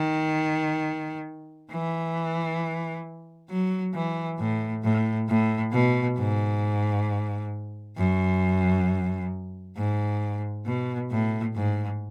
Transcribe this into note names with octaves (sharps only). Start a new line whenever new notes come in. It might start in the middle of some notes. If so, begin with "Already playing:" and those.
Already playing: D#3
E3
F#3
E3
A2
A2
A2
B2
G#2
F#2
G#2
B2
A2
G#2